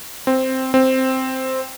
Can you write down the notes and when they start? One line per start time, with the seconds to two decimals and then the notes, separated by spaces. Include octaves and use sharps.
0.27 C4
0.74 C4